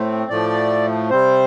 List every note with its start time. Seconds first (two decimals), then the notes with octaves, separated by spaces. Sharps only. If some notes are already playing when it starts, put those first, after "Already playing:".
Already playing: A2 A3 C4
0.29 A2 F3 A3 D5
1.10 C3 G3 C4 C5